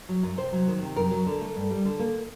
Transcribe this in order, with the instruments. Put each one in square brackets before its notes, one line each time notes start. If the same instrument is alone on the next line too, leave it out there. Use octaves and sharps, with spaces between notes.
[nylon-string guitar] F#3
F#2
C3 C5
F#3
D#3
C3
F#2 A#4
F#3
D3
A3
G2
G3
D3
A#3